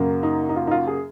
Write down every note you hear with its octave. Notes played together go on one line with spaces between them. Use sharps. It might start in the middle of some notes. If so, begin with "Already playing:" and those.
Already playing: F#2 C#3 F#3 A#3
D#4
D#4
F4
D#4
F4
G#4